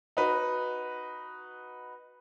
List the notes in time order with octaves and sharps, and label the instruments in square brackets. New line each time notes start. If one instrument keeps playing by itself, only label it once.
[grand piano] D#4 F#4 B4